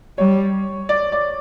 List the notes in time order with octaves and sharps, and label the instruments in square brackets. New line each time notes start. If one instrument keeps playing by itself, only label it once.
[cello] G3 [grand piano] C#5
[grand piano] D5
D5